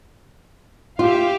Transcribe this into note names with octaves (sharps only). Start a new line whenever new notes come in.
F4 G4 E5 F5